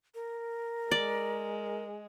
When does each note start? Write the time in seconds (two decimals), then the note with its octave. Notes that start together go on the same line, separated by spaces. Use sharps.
0.15 A#4
0.91 G#3 D5